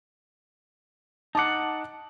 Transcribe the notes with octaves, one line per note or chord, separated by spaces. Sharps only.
D#4 F#5 A5 D6